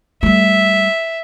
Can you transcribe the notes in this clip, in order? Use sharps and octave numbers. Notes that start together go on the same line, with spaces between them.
G3 A3 E5